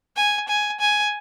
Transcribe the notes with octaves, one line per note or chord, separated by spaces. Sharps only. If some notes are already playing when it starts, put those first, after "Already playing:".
G#5
G#5
G#5